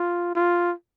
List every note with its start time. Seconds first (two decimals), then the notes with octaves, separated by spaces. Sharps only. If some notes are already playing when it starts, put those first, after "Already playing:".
Already playing: F4
0.35 F4